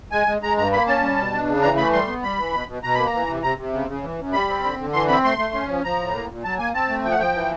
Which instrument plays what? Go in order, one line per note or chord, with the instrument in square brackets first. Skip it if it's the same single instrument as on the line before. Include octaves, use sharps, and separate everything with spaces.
[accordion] G#3 G#5
G#3
G#3 A#5
G2 A#5
A#3 B5
C#4 A5
G3
B2
D4
C#3
E3 A#5
A3 B5
G3 C6
B3
G3 B5
E3
B2
B2
B2 A#5
A#3 B5
A#5
E3
C3
C3 A#5
C3
C#3
C#3
E3
F#2
G3 B5
C4
D3
D3
E3 C6
C4 B5
A3 C6
A3
C#4
F3
F3 A#5
A2
A#3
A#2
F#3 A5
A#3 G#5
C4 A5
A3
F3 G5
F#5
F3 G5
E3